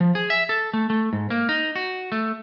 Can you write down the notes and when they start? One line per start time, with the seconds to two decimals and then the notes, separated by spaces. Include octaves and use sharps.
0.01 F3
0.15 G#4
0.30 E5
0.49 A4
0.74 A3
0.90 A3
1.13 G#2
1.30 A#3
1.49 D#4
1.76 F#4
2.12 A3